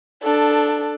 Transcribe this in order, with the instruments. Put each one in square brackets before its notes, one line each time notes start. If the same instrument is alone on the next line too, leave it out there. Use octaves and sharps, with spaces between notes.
[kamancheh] D4 A4